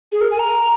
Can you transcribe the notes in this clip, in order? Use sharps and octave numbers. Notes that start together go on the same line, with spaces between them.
G#4
A#4
G#5
A#5